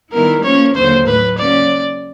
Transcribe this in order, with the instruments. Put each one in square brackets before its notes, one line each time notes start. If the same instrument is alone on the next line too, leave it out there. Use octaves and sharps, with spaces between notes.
[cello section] D#3 G3 B3 E4 [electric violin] A#4
[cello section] F3 A#3 C#4 [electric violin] C#5
[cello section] D#2 D3 F#3 A#3 [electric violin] C5
[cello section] A2 F#3 A3 [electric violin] B4
[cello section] C#3 F#3 A#3 C#4 [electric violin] D5